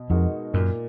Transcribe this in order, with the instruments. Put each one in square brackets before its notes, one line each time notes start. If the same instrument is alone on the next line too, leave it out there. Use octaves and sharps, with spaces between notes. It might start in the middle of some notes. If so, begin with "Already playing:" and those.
Already playing: [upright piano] B2
[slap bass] F2 [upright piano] G#3 D#4 F#4 A#4
[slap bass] F#2 [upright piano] A#2